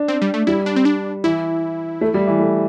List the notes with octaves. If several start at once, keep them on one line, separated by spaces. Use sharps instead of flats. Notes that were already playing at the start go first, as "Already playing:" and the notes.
Already playing: D4
C4
G3
A3
G3 E4
D4
C4
D4
E3 E4
A3
G3
E3
A3